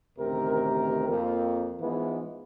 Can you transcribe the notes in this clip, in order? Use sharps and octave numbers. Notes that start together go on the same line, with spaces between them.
A1 D2 C3 D#3 A#4
F2 A#3
G#2 E3 F3 G#3 B3 E4